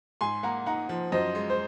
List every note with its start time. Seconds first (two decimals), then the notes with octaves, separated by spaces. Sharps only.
0.21 G#2 G#5 C6
0.43 A#3 F#5 A#5
0.66 D#4 F#5 A#5
0.89 F3
1.12 F#2 C5 D#5
1.35 G#3
1.50 C5